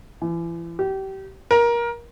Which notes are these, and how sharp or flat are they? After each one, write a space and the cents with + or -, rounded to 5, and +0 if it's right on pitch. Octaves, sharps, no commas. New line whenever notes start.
E3 +35
G4 -25
A#4 +20